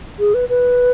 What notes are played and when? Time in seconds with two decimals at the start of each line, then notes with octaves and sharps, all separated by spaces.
0.19 G#4
0.34 B4
0.49 B4